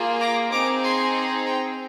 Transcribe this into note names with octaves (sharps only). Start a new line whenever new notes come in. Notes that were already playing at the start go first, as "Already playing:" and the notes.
Already playing: A#3 F4 G#4
A#5 D6
C4 D#4 G#4 A#5 D6
G#5 C6
G5 A#5